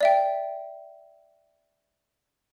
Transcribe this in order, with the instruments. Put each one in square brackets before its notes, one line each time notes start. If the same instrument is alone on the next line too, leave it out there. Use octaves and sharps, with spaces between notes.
[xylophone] D5 E5 G5